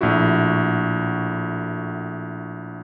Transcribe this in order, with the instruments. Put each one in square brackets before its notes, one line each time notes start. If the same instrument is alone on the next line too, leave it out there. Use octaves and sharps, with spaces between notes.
[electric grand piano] A#1 A2 E4 F#4